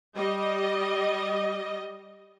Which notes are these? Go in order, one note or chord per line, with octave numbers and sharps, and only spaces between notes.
G3 D#5